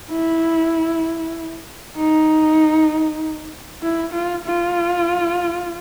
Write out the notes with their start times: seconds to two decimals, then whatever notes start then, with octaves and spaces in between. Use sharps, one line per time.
0.12 E4
1.97 D#4
3.82 E4
4.13 F4
4.45 F4